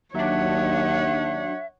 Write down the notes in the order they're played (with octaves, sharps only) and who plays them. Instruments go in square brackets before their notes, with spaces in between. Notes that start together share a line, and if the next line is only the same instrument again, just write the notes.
[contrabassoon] D#2 [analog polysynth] F#3 D4 [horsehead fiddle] C#5 F#5 [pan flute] E5